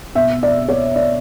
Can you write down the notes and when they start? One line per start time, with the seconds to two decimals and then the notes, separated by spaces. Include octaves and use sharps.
0.15 B2 E5
0.43 D5
0.69 C#5
0.96 D5